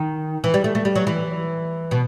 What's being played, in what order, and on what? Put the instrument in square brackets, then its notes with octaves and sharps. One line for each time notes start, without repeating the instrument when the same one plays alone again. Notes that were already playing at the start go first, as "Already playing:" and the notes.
Already playing: [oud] D#3
E3
G3
A3
A3
G3
F#3
E3
B2